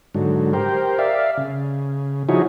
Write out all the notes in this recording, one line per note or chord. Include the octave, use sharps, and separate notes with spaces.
G#2 D3 F#3
G4 A#4 C5
D5 E5 F5
C#3
F3 D#4 E4 F#4 G#4 C#5